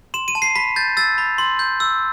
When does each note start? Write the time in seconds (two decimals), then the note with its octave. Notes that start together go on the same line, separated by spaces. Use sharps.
0.14 C6 E7
0.28 D#7
0.35 A5
0.42 C7
0.56 B5 B6
0.76 G6 A6
0.97 E6 A6
1.18 B5
1.38 C6
1.59 G6
1.80 E6